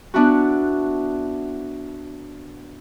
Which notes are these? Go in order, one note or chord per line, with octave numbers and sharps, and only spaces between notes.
B3 D4 E4 F#4